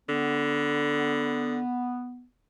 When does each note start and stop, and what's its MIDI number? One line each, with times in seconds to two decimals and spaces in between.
0.09 1.60 50
0.09 2.25 59